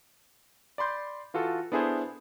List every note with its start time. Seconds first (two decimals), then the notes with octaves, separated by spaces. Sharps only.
0.78 D5 B5 C6 G6
1.34 E3 F4 F#4 A4
1.72 B3 D4 E4 G#4 A4 C5